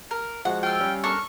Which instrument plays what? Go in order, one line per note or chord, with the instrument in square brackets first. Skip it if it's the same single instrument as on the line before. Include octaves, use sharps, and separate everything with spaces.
[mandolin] A#4
[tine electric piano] F3 G#3 F#4 [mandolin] F#5
[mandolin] F4 E6 [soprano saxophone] G5
[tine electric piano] G3 C#4
[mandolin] D4 A4 A#4 [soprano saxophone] C#6